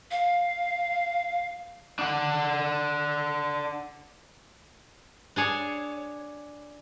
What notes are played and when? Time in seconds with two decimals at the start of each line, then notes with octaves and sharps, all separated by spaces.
0.11 F5
1.99 D4 F#5
5.36 D4 G#4 C#5